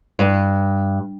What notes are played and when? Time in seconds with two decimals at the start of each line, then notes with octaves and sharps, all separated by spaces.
0.19 G2